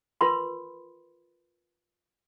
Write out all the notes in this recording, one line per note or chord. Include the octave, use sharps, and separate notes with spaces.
F4 A#4 B4 B5 C6